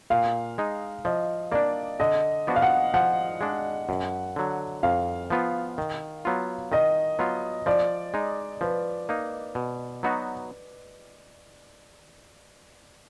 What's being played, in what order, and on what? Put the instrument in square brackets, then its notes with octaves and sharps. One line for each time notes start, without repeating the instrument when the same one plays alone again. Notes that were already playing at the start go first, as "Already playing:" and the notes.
[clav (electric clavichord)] A#2 [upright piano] F5
[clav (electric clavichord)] G#3 D#4
[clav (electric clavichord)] F3 [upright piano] D#5
[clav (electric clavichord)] A#3 D4 [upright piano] D5
[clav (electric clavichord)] D3 [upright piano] D#5
[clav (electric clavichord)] F3 B3 D4 F#4
[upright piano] F5
F#5
[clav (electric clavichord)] F3 [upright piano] F#5
[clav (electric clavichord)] G#3 D4
F#2
D3 F#3
[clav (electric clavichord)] F2 [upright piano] F5
[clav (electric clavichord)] F3 B3 F4
D#3
F#3 B3 F4
[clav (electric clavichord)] D#3 [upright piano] D#5
[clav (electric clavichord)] F#3 B3 F4
[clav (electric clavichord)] F3 [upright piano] D5
[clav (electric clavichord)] G#3 D#4
[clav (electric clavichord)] F3 [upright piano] B4
[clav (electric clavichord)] A#3 D#4
B2
F#3 B3 D#4 F#4